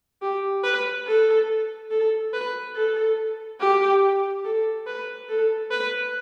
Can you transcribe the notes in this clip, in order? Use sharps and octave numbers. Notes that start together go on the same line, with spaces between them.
G4
B4
A4
A4
B4
A4
G4
A4
B4
A4
B4